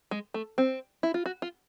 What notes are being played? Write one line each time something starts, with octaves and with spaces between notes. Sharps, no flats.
G#3
A3
C4
E4
F4
F#4
F4